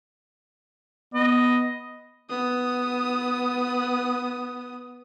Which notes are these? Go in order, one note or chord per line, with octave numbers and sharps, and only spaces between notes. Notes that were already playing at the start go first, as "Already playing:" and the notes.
B3 D#5
B3 D#6